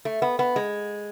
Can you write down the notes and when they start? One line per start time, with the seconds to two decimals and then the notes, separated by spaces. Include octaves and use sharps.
0.05 A3
0.22 B3
0.39 B3
0.56 G#3